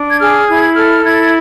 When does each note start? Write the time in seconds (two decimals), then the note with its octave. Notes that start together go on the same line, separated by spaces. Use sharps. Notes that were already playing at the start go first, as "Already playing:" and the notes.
Already playing: D4
0.10 G#6
0.19 G#4 F6
0.48 E4 G#6
0.76 A4 F6
1.04 E4 G#6